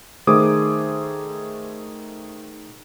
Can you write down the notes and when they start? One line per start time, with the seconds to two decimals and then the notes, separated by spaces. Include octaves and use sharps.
0.27 D#3 A3 G#4 C5 D6 D#6